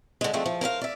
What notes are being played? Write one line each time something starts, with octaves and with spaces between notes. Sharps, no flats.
D3 G#3
F3 G#3 A3 C4 D4
F3
A#4 C5 D#5 F5
D5 E5